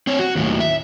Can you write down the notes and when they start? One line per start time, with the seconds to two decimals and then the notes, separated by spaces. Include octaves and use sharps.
0.07 C4 C#5
0.19 F#4
0.35 D#2 A2
0.60 E5